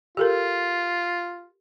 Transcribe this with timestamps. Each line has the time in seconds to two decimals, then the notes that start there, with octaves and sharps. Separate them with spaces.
0.17 F4 G4 A4 A#4